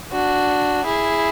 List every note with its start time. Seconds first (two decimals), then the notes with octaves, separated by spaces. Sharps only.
0.13 D4 F#4
0.85 E4 G#4